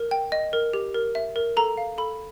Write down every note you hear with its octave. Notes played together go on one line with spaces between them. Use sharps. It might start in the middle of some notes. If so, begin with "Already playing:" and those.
Already playing: A#4
G5
D#5
A#4
G4
A#4
E5
A#4
A4 A#5
F5
A4 B5